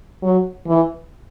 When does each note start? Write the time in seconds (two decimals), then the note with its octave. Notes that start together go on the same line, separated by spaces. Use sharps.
0.23 F#3
0.67 E3